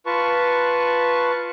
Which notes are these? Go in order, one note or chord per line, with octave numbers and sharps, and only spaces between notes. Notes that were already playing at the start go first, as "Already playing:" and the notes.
F4 B4 A5 C#6